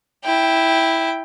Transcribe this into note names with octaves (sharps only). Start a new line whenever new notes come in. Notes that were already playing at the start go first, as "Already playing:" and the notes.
E4 G5